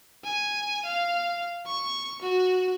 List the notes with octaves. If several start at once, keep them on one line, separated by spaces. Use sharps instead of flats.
G#5
F5
C#6
F#4